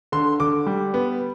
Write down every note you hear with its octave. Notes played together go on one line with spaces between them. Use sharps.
D3 C6
D3 D6
G3
B3